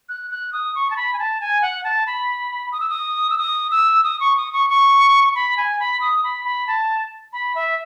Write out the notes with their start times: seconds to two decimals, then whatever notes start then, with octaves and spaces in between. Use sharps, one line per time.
0.09 F#6
0.31 F#6
0.53 D#6
0.75 C#6
0.91 A5
0.96 B5
1.13 G#5
1.19 A5
1.41 G#5
1.62 F#5
1.84 A5
2.07 B5
2.72 D#6
2.80 E6
2.89 D#6
3.30 E6
3.38 D#6
3.71 E6
4.04 D#6
4.20 C#6
4.37 D#6
4.53 C#6
4.70 C#6
5.35 B5
5.57 G#5
5.80 B5
6.01 D#6
6.24 B5
6.45 B5
6.67 A5
7.33 B5
7.55 E5